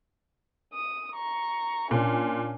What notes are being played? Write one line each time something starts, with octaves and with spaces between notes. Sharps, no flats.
D#6
A#5 C#6
A#2 C#4 D4